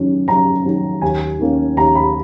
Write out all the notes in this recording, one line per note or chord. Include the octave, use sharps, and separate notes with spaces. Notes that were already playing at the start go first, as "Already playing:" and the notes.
Already playing: F#2 D#3 F#3 C#4
F#2 A#5
D#3 F#3 C#4
D#2 G#5
D#3 A#3 C#4
D#2 A#5
B5